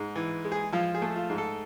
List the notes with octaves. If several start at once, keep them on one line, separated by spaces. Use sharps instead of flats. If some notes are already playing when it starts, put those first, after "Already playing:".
Already playing: G#2
E3
G#3
G#4
F3 F4
G#4
A3
F4
G#2
A4